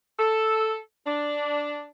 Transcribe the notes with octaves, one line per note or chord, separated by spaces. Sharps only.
A4
D4